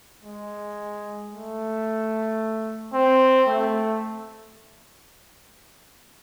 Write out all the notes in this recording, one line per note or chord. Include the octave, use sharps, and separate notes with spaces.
G#3
A3
C4
A3